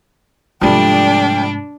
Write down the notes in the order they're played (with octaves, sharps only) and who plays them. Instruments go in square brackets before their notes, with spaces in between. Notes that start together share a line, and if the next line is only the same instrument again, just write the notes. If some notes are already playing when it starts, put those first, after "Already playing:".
[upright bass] G#2 C3 [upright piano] F3 G3 A3 [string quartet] D4 D5 [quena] G5